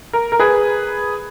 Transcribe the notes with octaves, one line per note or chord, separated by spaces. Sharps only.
A#4
A#4
G#4 B4